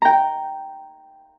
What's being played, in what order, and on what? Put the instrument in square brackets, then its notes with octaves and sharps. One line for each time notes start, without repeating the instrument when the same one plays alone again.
[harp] G5 A#5